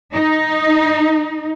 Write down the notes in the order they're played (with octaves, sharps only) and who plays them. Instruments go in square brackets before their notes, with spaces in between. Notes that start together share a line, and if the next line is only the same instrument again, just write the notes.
[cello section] D#4